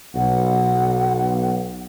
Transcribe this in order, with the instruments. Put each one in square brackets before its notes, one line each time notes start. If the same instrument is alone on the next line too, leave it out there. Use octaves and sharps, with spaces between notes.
[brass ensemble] B1 [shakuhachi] F#5